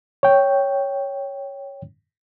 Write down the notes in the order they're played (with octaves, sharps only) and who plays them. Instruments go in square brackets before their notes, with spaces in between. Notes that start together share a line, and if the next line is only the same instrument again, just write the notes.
[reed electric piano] C#5 G5